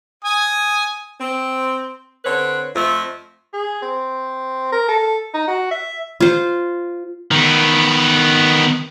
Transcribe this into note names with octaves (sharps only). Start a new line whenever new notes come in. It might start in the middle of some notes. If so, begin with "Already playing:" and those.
G#5 D#6
C4
D3 C4 B4 C#5
F2 A3 F4 E5
G#4
C4
A#4
A4
D#4
F#4
E5
F4 C5
D#3 B3